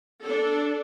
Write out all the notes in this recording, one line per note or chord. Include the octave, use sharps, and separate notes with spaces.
D4 A4